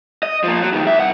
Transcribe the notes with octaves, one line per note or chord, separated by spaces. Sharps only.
D#5
F3 A#3
F#3
F2 D#3
E2 E5
C2 F#5